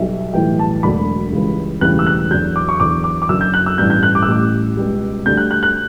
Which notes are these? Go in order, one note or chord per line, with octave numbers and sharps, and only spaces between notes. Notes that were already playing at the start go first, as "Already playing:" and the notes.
Already playing: B1 B2 G3 E5
B1 A2 E3 G3 G5
A5
E1 D2 D3 F#3 B5
C#2 C#3 E3 G3
E1 D2 C#3 E3 G3 F#6
E6
F#6
E2 D3 F#3 G6
D6
C#6
E2 D3 F#3 D6
D6
D6
F#1 F#2 D3 F#3 E6
G6
F#6
E6
A1 G2 E3 G3 G6
G6
F#6
D6
E6
A1 A2 G3 D6
C#2 B2 G3
D2 D3 G3 G6
F#6
F#6
F#6